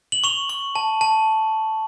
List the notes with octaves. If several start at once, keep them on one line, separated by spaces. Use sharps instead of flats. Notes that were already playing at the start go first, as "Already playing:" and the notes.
F#7
C#6 F7
C#6
A5
A5